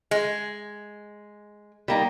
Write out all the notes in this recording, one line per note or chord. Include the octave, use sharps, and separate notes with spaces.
G#3
G3 A#3 D#4